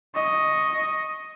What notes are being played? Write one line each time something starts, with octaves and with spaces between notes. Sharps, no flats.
D#5 C#6